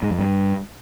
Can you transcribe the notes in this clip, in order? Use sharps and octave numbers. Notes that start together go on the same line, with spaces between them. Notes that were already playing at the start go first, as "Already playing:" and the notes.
G#2
F2
G2